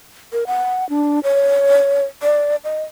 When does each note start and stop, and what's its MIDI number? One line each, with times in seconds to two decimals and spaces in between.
0.33 0.44 70
0.47 0.88 78
0.89 1.20 62
1.24 2.05 73
2.22 2.56 74
2.64 2.82 75